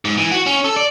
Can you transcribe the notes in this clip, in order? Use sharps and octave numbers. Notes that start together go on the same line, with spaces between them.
G#2
E3
F#4
C#4
A4
D5